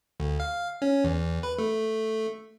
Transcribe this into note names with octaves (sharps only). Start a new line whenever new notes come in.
D2
F5
C#4
E2
B4
A3